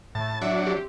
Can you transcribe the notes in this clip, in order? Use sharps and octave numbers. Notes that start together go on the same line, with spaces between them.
A2 A5
F#3 D4 E5
C4 G4